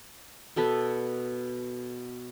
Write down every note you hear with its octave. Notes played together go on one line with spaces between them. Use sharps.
B2 B3 A4 B4